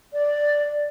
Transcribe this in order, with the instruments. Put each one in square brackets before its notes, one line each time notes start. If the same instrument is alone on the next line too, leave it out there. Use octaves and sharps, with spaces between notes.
[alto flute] D5